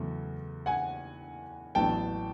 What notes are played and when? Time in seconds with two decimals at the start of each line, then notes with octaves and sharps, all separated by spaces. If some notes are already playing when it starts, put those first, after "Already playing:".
Already playing: E2 C#3 F#3 A3
0.66 F#5 G#5
1.75 A1 A2 F#3 B3 D4 G5 A5